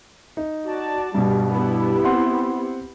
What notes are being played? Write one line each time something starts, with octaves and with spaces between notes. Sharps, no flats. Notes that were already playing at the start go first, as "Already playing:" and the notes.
D#4
F#4 D5 A5
G2 B2 G3
B3 E4 G4
C4 F#5 C6